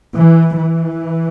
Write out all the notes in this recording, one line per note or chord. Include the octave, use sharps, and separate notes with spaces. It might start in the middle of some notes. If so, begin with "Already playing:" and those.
E3
E3